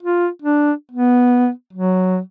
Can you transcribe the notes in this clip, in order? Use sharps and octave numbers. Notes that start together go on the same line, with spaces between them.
F4
D4
B3
F#3